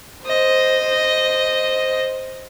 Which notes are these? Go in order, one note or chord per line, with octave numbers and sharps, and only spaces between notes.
C5 D#5